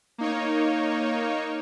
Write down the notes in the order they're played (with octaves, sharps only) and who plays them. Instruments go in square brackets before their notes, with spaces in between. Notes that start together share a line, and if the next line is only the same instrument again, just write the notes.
[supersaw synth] A#3 D#4 C#5